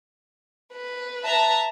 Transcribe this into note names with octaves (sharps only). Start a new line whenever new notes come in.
B4
E5 A5 A#5